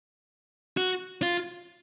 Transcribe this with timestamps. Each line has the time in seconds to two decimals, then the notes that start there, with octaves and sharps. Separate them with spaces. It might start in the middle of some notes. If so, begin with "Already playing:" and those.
0.77 F#4
1.22 F4